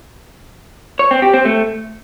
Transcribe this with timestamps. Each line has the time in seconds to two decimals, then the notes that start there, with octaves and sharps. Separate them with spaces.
0.99 C#5
1.11 C4
1.22 G4
1.34 C4
1.45 A3